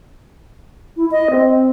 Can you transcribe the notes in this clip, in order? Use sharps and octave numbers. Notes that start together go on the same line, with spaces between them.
E4
D#5
C4